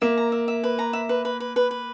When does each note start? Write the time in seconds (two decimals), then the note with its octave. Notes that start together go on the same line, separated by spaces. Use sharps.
0.02 A#3 E5
0.17 A#5
0.32 E5
0.48 E5
0.63 B4
0.79 A#5
0.93 E5
1.09 B4
1.25 B4
1.40 B4
1.56 B4
1.71 B4